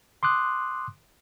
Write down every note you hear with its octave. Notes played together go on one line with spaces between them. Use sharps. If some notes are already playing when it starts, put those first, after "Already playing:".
C6 D6 D#6 F#6